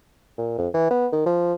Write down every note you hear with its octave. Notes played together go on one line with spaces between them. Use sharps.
A#2
F2
E3
B3
D#3
F3